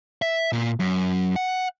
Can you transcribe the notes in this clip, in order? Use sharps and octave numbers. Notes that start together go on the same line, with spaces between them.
E5
A#2
F#2
F#5